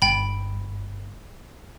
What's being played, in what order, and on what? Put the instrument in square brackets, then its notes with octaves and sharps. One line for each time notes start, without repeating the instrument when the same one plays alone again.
[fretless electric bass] G1 [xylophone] G5 B5